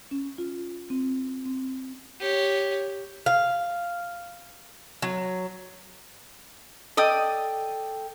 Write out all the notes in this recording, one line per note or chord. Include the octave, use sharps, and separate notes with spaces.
C#4
F4
C4
C4
G4 C#5
F5
F#3
A4 D5 D#5 G5 D#6